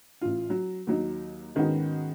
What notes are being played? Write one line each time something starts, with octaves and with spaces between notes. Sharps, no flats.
A1 F4
F#3
D#2 F#3 D#4
G#2 D#3 B3 C#4 D#4 F#4